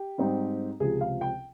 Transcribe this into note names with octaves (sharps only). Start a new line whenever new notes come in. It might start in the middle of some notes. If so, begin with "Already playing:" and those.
Already playing: G4
G#2 G3 C4 D#4
C#2 C3 F3 G#4
F5
G5